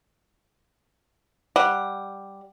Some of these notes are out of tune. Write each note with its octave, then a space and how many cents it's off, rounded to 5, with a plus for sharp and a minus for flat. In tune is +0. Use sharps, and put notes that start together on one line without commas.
G3 +0 F#5 +0